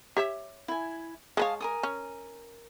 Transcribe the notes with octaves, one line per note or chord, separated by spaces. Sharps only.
G4 C#5 E5
E4 G#5
G#3 B4 C#5 F5 A5 D#6
A#4 G#5 D#6
C#4